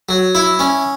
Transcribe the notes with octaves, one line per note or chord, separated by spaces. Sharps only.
F#3
E4
C#4